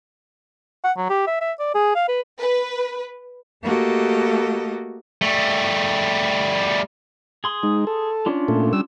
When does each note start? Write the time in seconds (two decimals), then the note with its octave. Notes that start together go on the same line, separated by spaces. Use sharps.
0.84 F#5
0.97 F#3
1.09 G4
1.27 E5
1.41 E5
1.59 D5
1.74 G#4
1.95 F5
2.08 B4
2.39 B4
3.63 A3 A#3 F#4 G4 A4 D#5
5.22 G3 A3
7.44 G#4 C6 D#6
7.63 G#3 D#4
7.87 A4
8.26 C#4 D4 F4
8.48 A#2 A3
8.73 G3 E6